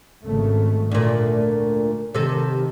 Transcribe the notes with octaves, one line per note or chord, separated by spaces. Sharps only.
G#1 C#3 A3
D2 A#2 A3
C3 D#3 A4